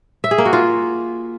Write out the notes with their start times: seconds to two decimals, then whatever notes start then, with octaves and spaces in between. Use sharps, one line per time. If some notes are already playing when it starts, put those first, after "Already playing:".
0.24 E5
0.31 G#4
0.38 A#3
0.46 F#4
0.53 F4